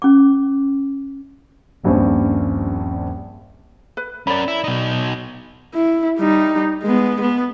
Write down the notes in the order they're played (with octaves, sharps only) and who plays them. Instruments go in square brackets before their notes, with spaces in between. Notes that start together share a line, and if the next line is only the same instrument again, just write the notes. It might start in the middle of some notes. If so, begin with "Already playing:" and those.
[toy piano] C#4 D6
[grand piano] D#1 A#1 G2 C4 C#4
[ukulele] B4
[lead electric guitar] C#4 A#4 [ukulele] D5 B5
[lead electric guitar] E4
B2 D#4
[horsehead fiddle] E4
G3 D#4
G#3 B3
B3